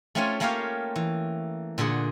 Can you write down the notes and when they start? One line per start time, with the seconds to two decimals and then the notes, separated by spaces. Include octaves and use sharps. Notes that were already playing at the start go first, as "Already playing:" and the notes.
0.15 A3 C4 C#4 F4 C#5 G#5
0.40 A3 A#3 C#4 G4 C#5 F5
0.96 E3
1.78 A#2 D3 G#4 F#5